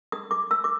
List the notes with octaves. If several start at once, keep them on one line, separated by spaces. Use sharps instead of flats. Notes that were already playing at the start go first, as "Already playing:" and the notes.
D#6
D6
E6
D6